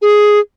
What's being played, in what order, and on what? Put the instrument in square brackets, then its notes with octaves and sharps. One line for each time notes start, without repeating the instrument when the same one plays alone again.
[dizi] G#4